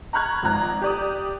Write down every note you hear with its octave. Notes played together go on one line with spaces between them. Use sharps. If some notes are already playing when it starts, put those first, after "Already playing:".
A#5 B5 C#6 F6 F#6 G#6
G#1 F3 F4 A#5 F#6
G4 D5 D#6